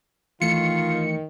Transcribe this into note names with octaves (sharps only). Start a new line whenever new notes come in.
D#3 E3 A3 F4 C#7